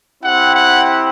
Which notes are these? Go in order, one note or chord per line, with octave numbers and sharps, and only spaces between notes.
C4 E4 G4 F#5
F#5